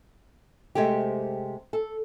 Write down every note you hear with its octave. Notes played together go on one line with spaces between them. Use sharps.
C3 G#3 A3 C4 G4
A4